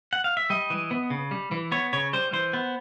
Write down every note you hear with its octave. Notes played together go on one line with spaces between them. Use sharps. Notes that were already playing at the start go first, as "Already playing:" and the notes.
F#5
F5
E5
G3 D#5
E3
B3
C#3
G3
E3
B3 C#5
C#3 C#5
G3 C5
E3 C5
B3